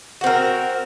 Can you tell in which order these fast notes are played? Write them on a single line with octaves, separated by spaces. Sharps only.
F#4 C4 A#4